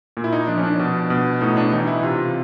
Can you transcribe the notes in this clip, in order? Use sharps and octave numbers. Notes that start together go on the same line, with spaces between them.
A#2
E4
D#4
F3 D4
C#4
D4
B2
B2
A2 D#4
D4
E3 D#4
E4
C3 F4